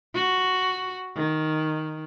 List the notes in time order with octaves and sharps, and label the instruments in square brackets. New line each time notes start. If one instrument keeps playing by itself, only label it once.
[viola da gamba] F#4
D#3